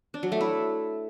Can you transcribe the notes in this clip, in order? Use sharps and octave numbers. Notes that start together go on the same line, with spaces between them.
D4
F#3
A3
E4